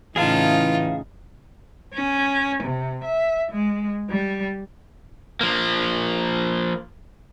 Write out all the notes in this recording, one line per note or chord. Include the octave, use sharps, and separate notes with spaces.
A2 C#3 E3 D#4 F4 G#4 F5 A5
C#4
C3
E5
G#3
G3
F3 A#3